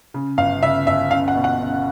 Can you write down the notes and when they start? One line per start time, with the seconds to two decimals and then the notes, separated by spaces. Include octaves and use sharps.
0.14 C#3
0.38 G1 F5
0.63 C#3 E5
0.87 G1 E5
1.11 C#2 F5
1.28 F#5
1.35 B2
1.44 F#5
1.60 C#2